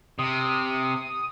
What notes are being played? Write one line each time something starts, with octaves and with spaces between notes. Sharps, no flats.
C3 D#6